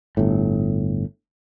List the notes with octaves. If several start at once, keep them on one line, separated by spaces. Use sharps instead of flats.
G1 A2